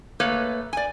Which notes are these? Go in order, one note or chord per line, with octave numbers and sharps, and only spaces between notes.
A3 A#3 B4 C#5
D5 G#5